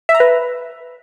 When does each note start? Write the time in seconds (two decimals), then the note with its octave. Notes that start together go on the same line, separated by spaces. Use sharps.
0.09 E5
0.15 A#5
0.20 B4